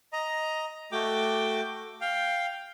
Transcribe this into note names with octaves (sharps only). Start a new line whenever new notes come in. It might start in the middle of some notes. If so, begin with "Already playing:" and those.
D#5 A#5
A3 F#4 G5 D6
F5 G5